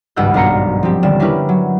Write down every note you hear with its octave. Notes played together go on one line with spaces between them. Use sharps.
G#1 C#2 G2 F#5 E6 G6
B1 D4 F5 A#5 C#7
F3 C4 G4
D#1 D3 G3 E7
C#4 D4 E4 G4 A#4 B4
F#3